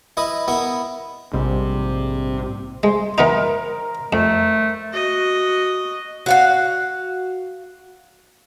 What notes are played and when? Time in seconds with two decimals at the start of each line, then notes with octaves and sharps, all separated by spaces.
0.17 E4 B4 D#5
0.48 B3 E4 A#4
1.34 A#1 G#2 C3 G3
2.83 G#3 C5 C6
3.18 E3 B3 D#4 A#4
4.13 F2 A3
4.93 F#4 D#5
6.26 F#4 F5 F#5